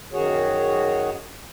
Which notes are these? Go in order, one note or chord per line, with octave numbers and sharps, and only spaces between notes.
F#2 D#3 F#4 G#4 C#5